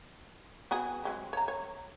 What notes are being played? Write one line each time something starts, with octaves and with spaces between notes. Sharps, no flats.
B3 F#4 G#4
F#3 G#3 C4
C#5 A#5
C#5